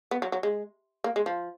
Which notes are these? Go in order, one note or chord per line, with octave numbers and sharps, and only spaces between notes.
B3
F#3
F#3
G#3
A#3
G#3
F3